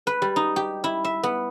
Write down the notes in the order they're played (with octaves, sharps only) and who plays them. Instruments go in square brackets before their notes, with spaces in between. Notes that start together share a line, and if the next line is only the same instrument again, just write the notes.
[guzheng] B4
G3
D#4
G4
E4
E5
B3